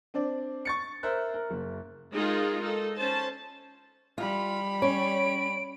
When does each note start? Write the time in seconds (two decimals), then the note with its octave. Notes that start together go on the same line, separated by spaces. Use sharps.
0.14 C4 D4 D5
0.65 C#6 A6 C#7
1.03 A#4 C5 E5 F#6
1.34 A#4
1.50 F#1
2.13 G#3 D#4 F4 G#4 A#4
2.62 D#4 A4
2.97 C#4 C5 A5
4.18 G3 F4 B5
4.82 C#4 C#5 D7